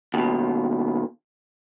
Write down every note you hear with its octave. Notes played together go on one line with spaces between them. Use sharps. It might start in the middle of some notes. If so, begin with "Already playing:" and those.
D#2 B2